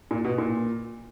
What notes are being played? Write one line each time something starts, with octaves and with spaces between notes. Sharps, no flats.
A#2
B2
A#2